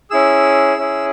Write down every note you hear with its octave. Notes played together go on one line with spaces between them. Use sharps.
C#4 E4 G#4 E6
C#4 E4 G#4